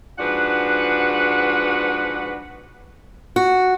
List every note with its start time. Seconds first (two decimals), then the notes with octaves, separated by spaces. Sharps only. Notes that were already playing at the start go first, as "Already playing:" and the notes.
0.19 G#2 F3 D4 F#4 B4 F#5
3.36 F#4